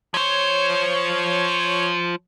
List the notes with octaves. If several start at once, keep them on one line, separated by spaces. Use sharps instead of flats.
F3 C5 C#5